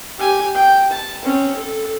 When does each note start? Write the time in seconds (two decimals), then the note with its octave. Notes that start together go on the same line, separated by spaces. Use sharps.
0.18 G4 G#5
0.55 G5
0.91 A5
1.24 C4 C#4
1.56 A4